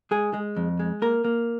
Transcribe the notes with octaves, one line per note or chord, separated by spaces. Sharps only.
G#3 G#4
G#3
F2
G#3
A#3 A#4
A#3